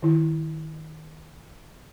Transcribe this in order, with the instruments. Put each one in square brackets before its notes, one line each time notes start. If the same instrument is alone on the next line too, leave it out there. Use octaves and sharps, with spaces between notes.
[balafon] D#3 E4